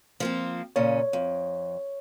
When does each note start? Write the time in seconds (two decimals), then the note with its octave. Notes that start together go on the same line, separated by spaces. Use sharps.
0.20 F3 A#3 C4
0.76 A#2 C#3 C#4 C#5
1.13 F2